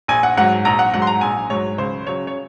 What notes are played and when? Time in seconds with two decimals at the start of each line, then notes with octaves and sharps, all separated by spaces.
0.08 A#1 G#5
0.23 F#5
0.37 G#2 F#3 F#5
0.65 A#1 A#5
0.79 F#5
0.94 G#2 F#3 F#5
1.02 C6
1.07 A#5
1.21 A#1 G#5
1.50 G#2 F#3 C#5
1.78 C#2 C5
2.07 C#3 F#3 C#5
2.27 C#5